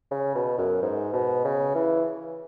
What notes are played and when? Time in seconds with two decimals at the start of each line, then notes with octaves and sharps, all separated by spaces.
0.11 C#3
0.35 B2
0.58 F#2
0.82 G#2
1.13 B2
1.45 C#3
1.75 E3